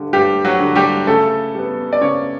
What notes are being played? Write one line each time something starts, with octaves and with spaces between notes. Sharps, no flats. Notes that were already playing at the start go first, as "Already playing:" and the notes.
Already playing: G2 D3 G3
G2 G3 G4
F#3 F#4
D3 G3
G3 G4
C#3 A3 A4
G3 B3
D5
C#3 C#4 C#5